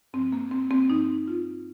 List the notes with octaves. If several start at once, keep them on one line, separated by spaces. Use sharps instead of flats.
G2 F3 C4
A#3
C4
C4
G2 F3 D#4
F4